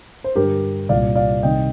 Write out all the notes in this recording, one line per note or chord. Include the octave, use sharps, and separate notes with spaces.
C5
G2 D3 G4 A#4
C2 A#2 D5 F5
D5 F5
C2 C3 D#3 D#5 G5